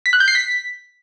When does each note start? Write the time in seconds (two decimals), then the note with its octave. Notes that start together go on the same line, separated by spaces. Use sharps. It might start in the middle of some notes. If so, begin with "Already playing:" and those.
0.06 B6
0.13 F#6
0.20 G6
0.28 C7
0.35 B6